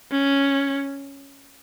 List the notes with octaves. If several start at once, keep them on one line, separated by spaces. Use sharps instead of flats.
C#4